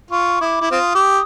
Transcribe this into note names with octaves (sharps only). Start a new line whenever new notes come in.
F4 C#6
E4 D6 D#6
E4
C4 F4 D#6
G4